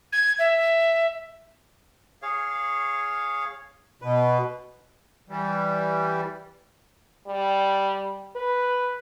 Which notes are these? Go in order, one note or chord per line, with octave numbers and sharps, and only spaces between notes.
G#6
E5
G#4 C#5 F5
B2 B4
E3 G3
G3
B4